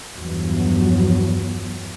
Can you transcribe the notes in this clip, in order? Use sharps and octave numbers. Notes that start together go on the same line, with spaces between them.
E2 G2 F3 F#3